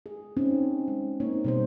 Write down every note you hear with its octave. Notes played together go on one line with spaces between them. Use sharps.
G#4
C4 C#4 D#4
G#3
A#3 C4 D#4 C#5
B2 G3 C5